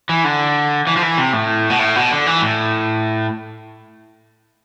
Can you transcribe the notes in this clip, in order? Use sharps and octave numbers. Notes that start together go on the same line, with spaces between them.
E3
D3
E3
F3
E3
C3
A2
B2
A2
B2
D3
E3
A2